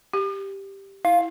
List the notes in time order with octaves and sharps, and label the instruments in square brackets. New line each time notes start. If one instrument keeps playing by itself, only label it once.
[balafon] G4
[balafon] E4 [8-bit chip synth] F5